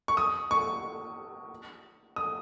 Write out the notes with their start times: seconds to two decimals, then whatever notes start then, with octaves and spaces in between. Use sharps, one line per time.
0.08 C#6
0.17 D#6
0.51 C#6
2.16 D#6